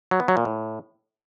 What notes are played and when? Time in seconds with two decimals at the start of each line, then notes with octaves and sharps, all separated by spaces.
0.11 F#3
0.20 B3
0.28 F#3
0.37 A#2
0.45 A2